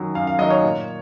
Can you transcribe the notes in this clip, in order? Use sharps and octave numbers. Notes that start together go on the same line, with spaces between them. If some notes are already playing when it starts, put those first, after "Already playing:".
Already playing: F#2 D#3 F#3
F#2 F5
F5
D#3 F#3 D#5
C#5
A#2